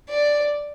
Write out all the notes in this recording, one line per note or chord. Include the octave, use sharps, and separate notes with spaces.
D5